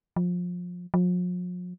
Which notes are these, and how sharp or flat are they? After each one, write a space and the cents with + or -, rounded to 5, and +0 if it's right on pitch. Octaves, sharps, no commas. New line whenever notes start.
F3 +25
F3 +45